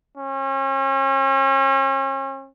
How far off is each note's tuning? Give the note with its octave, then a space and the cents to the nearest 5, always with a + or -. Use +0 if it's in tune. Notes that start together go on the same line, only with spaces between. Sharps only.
C#4 -40